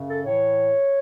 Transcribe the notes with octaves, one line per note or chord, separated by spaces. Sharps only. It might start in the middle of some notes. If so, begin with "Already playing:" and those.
Already playing: F#2 C#3
A4
A2 E3 C#5